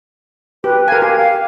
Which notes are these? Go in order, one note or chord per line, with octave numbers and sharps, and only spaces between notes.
G4 B4
A#4 F5 G#5
G4
F5